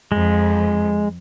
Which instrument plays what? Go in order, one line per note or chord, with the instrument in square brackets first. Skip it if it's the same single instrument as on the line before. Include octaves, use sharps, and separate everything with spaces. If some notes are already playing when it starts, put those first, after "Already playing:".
[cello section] F2 [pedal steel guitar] G#3